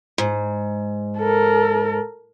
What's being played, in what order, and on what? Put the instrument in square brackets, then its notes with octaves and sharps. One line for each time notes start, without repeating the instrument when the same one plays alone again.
[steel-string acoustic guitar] G#2
[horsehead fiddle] A4 A#4